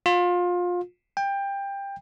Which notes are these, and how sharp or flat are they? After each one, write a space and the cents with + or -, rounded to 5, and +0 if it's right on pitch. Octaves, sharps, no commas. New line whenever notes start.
F4 +25
G5 +20